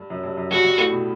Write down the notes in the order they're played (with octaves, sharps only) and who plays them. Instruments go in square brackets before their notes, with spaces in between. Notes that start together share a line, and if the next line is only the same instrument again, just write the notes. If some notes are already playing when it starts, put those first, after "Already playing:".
Already playing: [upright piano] G2
F#2
G2
F#2
[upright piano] G2 [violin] F#4
[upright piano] G2
A2
B2